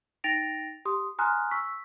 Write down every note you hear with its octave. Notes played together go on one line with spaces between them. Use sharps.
D#4 G5 A6 A#6 D7 F7
G4 C6 D#6
G#5 A#5 C6 D#6 F6 F#6
C#6 E6 B6